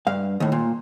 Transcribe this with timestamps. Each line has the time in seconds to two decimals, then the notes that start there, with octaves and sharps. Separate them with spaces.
0.07 G2 F5
0.40 D#2 A2
0.52 A#2